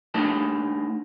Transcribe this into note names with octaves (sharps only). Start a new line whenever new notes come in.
A3 D4 D#4 A#4 A5